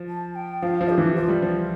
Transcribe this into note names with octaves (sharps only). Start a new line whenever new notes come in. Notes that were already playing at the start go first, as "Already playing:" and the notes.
Already playing: F3
A5
G5
F3 F5
F3
G4
E3
F3 F4
G3
F3